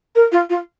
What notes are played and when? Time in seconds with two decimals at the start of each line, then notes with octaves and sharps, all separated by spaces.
0.15 A#4
0.32 F4
0.50 F4